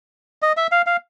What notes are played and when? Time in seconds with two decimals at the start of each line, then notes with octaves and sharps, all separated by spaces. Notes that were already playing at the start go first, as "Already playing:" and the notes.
0.42 D#5
0.57 E5
0.72 F5
0.86 F5